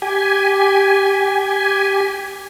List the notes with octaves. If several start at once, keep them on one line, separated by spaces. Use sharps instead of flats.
G4 G#5